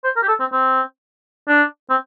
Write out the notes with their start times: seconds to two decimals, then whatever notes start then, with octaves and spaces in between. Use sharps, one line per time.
0.05 C5
0.16 A#4
0.23 G4
0.28 A4
0.40 C4
0.52 C4
1.48 D4
1.90 C4